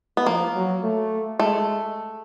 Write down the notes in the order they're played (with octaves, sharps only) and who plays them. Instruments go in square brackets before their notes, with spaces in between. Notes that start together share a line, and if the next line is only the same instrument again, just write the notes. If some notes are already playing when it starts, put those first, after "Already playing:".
[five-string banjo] B3
[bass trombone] F3 [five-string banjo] A#3
[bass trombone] F#3
A3
[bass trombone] G#3 [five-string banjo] A3